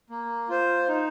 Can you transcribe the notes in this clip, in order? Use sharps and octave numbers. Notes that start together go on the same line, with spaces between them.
A#3
F4 C5
D#4